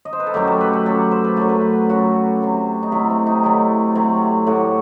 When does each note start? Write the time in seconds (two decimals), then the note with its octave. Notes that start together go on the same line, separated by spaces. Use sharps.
0.05 D#5
0.13 C5
0.20 B4
0.27 A4
0.34 F#2 F#3 A3 G4
0.47 A4
0.61 B4
0.73 A4
0.86 F#2 F#3 A3 A4
1.12 C5
1.24 B4
1.36 F#2 F#3 A3 A4
1.49 B4
1.89 F#2 F#3 A3 F#4
2.40 C3 F#3 A3
2.83 D#4
2.92 C3 F#3 A3 E4
3.10 C4
3.27 D#4
3.43 C3 F#3 A3 E4
3.95 C3 F#3 A3
4.46 A2 F#3 A3 F#4